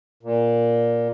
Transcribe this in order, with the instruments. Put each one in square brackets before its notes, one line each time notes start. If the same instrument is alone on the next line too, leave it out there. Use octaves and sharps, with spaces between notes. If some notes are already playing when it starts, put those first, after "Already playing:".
[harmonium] A#2